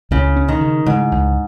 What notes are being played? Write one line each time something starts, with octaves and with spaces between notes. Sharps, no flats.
C#2 C#3
C#4
D#3
C#3
G#2 C#3
C#2